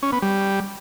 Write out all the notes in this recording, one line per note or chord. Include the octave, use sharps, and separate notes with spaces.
C#4
B3
G3